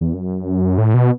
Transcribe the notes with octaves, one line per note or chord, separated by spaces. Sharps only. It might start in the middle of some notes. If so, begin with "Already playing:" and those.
E2
F#2
A2
B2